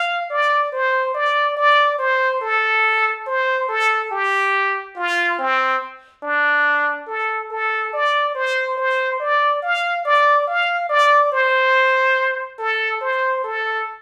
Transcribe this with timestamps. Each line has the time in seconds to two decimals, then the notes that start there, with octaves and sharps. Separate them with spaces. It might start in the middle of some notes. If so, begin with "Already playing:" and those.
Already playing: F5
0.30 D5
0.72 C5
1.14 D5
1.57 D5
1.99 C5
2.41 A4
3.26 C5
3.69 A4
4.11 G4
4.96 F4
5.39 C4
6.23 D4
7.08 A4
7.51 A4
7.93 D5
8.35 C5
8.77 C5
9.20 D5
9.62 F5
10.05 D5
10.47 F5
10.90 D5
11.32 C5
12.59 A4
13.01 C5
13.44 A4